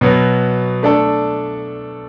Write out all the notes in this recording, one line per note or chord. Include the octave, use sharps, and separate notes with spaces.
B2 F#3 B3
A3 D4 A4